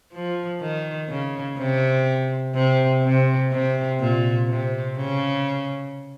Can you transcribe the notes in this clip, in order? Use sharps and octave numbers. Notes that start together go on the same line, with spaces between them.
F3
D#3
C#3
C3
C3
C3
C3
A#2
C3
C#3